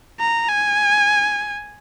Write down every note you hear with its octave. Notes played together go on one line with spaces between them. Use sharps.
A#5
G#5